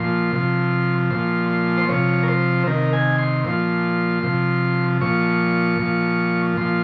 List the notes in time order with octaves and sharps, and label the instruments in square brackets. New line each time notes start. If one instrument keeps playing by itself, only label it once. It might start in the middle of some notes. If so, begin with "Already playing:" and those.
Already playing: [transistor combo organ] A#2 F3 C6
C3 F3
A#2 F3 C6
C6
C5
C3 F3 C#5
A#4
C5
C3 D#3 A#4
G#5
C6
A#2 F3 C6
C3 F3
A#2 F3 C#6
A#2 F3
A#2 F3 C6